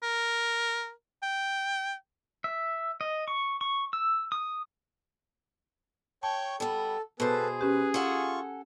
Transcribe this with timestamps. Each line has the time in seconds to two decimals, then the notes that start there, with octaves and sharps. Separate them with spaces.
0.03 A#4
1.23 G5
2.44 E5
3.01 D#5
3.28 C#6
3.61 C#6
3.93 E6
4.32 D#6
6.23 C#5 G5 A5 C#6
6.60 G3 B3 A4
7.20 B2 B3 G#4 A4 B4 C5
7.61 C#4 G4 B4
7.94 F4 A4 F#5 G#5 C#6